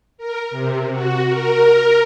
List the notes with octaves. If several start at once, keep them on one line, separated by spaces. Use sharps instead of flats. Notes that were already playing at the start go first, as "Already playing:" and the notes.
A#4
C3
F#4
A#4